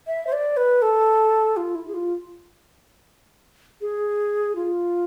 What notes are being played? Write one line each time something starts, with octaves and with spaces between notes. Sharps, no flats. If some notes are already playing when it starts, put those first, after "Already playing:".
E5
C5
D5
B4
A4
F4
E4
G#4
F4
G#4
F4